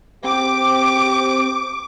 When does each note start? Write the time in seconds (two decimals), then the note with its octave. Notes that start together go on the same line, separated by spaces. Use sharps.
0.24 C4 G4 D6